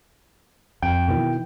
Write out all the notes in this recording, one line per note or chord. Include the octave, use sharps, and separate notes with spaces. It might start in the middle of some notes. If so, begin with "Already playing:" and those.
F2 G5
B2 D#3 E3